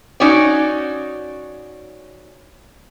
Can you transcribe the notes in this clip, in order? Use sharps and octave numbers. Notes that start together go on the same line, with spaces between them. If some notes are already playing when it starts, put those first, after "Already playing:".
C#4 D#4 F#4 C#5 D5